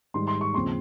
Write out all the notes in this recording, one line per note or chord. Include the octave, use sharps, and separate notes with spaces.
G#2 D#3 G3 C6
C6
C#6
D#2 C#3 F3 C4 C6